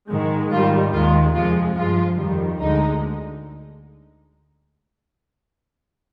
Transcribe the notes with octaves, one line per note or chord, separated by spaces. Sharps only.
G#2 D#3 G#3
G#2 D#3 G3 F4
D#2 D#3 G#3 F4
F2 C3 F3 G#3 F4
G2 F3 G#3 F4
F2 D#3 G3
D2 D3 G#3 D#4